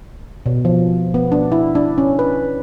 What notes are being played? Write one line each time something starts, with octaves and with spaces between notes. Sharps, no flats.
B2
F3
B3
D4
E4
D4
C#4
B4